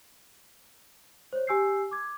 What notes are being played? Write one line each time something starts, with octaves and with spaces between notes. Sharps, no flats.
C5 C#5
G4 G#5 E6 G6 C7
D6 G#6